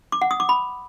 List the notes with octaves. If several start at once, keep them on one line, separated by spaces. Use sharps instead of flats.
D6
F#5
D#6
D6
B5